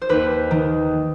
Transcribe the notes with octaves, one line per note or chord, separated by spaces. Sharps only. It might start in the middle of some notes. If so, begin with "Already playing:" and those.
C5
D#2 B4
D#3